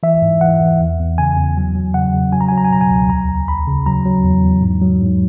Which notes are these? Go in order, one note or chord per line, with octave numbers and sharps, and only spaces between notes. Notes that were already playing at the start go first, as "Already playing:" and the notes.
E3 E5
G#2
E3 F#5
E3
E2
E2
C#3 G#5
E2
F#3
F#3
C#3 F#5
C#3
F#3 G#5
A#5
G#5
F#3
A#5
G#5
B2 A#5
G#5
C#2
D#2 A#5
D#2
D#2 B5
C#3
F#3 A#5
F#3
E2
E2
G#2
F#3
G#2